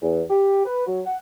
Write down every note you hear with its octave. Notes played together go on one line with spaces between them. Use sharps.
E2
G4
B4
F#3
F#5